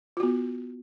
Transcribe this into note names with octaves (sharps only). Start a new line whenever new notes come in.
B3 F4 F#4